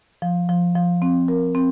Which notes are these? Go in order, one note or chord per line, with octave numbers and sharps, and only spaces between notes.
F3
F3
F3
C4
A#4
C4